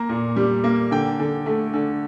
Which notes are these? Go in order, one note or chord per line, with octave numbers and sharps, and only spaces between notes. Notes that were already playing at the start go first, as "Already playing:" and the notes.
Already playing: A#3 A#5
A#2
G3
A#3
D3 G5
D3
A3
D3